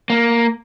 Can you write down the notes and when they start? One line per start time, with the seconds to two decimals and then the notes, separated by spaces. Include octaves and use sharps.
0.10 A#3